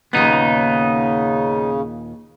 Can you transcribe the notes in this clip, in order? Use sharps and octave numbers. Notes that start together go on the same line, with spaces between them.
D#2 A#2 C#3 B3 D#4 F#5